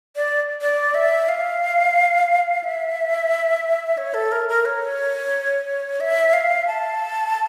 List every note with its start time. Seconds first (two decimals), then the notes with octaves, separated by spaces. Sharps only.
0.16 D5
0.61 D5
0.94 E5
1.28 F5
2.64 E5
3.98 C#5
4.14 A4
4.32 A#4
4.49 A#4
4.65 C#5
6.00 E5
6.33 F5
6.67 A5